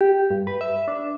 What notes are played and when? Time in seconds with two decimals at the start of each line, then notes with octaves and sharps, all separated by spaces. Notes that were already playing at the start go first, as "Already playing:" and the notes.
0.01 G4
0.30 G2
0.47 B4
0.61 E5
0.88 D4